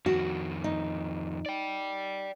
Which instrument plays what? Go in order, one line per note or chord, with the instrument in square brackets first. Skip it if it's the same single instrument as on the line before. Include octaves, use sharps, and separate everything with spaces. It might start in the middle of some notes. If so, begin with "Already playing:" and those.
[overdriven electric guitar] F2 D#3 [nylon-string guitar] F#4
[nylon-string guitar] D#4
[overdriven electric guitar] D5 G5